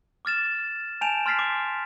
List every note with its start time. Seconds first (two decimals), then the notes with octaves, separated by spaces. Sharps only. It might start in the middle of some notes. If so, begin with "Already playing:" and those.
0.25 D6 F6 A6 E7
1.01 G#5 A5 G6 D7 E7 F7
1.26 C6 F6 A6 B6 C7
1.39 D6